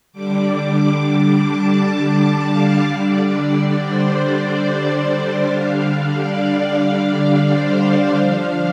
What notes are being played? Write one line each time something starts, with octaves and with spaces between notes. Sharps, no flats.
D3 G3 D4 D6
D6
A5
F5
D3 G3 D4 D5
D5
C5
C5
D3 G3 D4 F5
D5
C5
F3 D4 F5